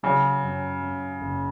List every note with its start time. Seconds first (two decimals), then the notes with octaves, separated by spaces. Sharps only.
0.03 C#3 F#3
0.43 F#2
0.81 F#2
1.21 F#1